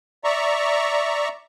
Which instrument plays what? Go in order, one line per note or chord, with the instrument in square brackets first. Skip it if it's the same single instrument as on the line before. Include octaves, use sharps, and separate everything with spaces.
[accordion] D5 E5 A#5 C#6